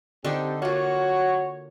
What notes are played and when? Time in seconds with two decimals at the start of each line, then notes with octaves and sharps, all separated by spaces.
0.25 D3 C4 D4 D#4 G4 A4
0.62 A#3 F4 F#4 C#5